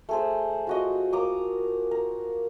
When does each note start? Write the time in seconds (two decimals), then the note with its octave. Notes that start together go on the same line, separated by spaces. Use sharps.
0.09 A3 G#4 C5
0.67 F4 F#4 D#5
1.13 A#3 A#5 D6 D#6
1.91 A#4